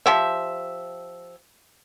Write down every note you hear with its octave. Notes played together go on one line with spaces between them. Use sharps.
F3 G4 E5